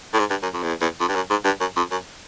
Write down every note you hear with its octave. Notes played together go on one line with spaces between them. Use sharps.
A2
G#2
G2
F#2
F2
E2
E2
F2
G2
F#2
G#2
G2
F#2
F2
F#2